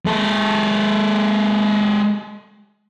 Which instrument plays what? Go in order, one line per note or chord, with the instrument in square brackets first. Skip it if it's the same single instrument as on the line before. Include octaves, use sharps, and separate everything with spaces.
[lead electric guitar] G#3 A4